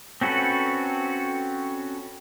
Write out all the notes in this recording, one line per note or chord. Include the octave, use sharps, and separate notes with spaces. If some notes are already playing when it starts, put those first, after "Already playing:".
C4 C#4 F#4 A4 B4